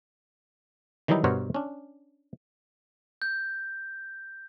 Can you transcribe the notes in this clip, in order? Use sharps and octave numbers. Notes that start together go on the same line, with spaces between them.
D#3 E3 F#3 G3 D#4 E4
G2 B2 A#4 C5 C#5 F#5
C#4 D4
G6